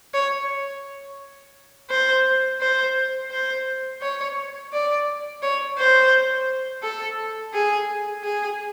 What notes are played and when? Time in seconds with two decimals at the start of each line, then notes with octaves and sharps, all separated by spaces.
0.14 C#5
1.90 C5
2.61 C5
3.31 C5
4.02 C#5
4.73 D5
5.42 C#5
5.78 C5
6.83 A4
7.54 G#4
8.24 G#4